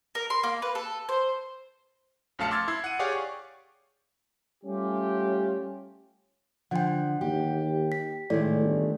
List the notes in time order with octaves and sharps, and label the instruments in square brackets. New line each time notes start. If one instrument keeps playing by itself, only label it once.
[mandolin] A#4
C6
A#3
B4
A4
C5
[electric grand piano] A#1 F#2 A3 F5 A5 C#7
C6 D6 E6 F6 G#6 A6
E4 E6 G#6 C7
F#5 D#7
G4 G#4 C#5 D5 F5 F#5
C#6
[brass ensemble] G3 A3 C#4 F4 G4
[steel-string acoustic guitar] D3 F3 [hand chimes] F#5 G5
[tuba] D#2 [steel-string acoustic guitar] G4
[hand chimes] B6
[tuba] A2 [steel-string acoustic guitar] D#3 G#3 A3 [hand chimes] D5
[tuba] G1